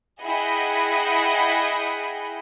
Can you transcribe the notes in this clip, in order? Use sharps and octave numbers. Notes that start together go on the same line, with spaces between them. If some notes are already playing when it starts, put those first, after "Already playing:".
E4 G#4 D#5 F#5 G5 B5